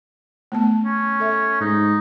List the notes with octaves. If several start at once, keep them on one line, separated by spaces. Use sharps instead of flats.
A3 B3 A5
C#4
A4 E5
G#2 D#4